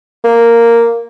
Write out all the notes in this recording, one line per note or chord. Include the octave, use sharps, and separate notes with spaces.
A#3